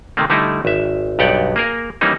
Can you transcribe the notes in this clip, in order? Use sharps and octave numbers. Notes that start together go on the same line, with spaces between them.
C3 D#3 A3 A#3
D3 G3 A3 D#4 E4
G#1 E5
B1 G2 G4 D5 F#5 G5
A#3 G#4 A#4
E3 G3 A#3 C#4 D#4